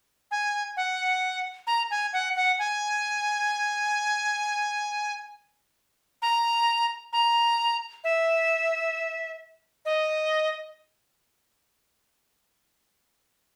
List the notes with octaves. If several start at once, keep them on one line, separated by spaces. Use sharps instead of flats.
G#5
F#5
A#5
G#5
F#5
F#5
G#5
A#5
A#5
E5
D#5